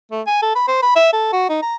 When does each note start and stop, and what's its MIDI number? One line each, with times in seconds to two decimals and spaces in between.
0.11 0.21 57
0.27 0.41 80
0.42 0.52 69
0.55 0.63 83
0.68 0.78 72
0.82 0.91 83
0.96 1.09 76
1.13 1.29 69
1.33 1.49 66
1.49 1.59 63
1.62 1.76 82